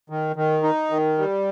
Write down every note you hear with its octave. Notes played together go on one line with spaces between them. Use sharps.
D#3
D#3
D#4
D#3
G3